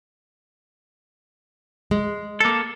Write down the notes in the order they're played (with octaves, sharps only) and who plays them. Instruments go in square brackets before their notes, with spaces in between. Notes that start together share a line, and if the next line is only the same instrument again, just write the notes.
[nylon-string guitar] G#3
[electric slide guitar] A#3 A4